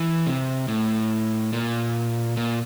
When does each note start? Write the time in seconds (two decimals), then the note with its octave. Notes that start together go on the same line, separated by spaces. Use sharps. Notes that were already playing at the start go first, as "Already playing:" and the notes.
Already playing: E3
0.27 C3
0.68 A2
1.53 A#2
2.37 A#2